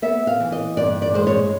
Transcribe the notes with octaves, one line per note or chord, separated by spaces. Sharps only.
B3 E5
F5
E3
D#5
G2 D5
D5
G#3 C5
C#5